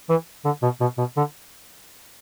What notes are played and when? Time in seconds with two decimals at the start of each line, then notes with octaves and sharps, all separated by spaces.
0.09 E3
0.45 D3
0.62 B2
0.81 B2
0.98 B2
1.17 D3